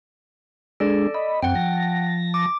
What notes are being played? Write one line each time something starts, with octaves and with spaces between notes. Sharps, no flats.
G#3 D4 G#4 A4 D5
D#5 B5
F#2 C4 F#5 G5
F3 A5 A#6
D6